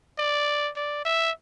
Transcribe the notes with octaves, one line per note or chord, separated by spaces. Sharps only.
D5
D5
E5